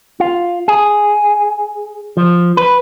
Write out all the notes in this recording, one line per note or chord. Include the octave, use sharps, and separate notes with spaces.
F4
G#4
F3
B4